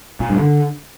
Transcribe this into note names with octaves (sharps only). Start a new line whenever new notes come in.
A#2
G2
D3